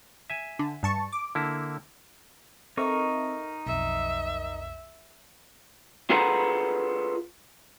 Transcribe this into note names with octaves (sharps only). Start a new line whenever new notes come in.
E5 G#5
D3
G2 A5 C#6
D6
D3 A#3 E4
C4 D#4 A4 A#4 E5 C#6
B1 F2 E5
F4 G#4 A4 B4 F#5 A#5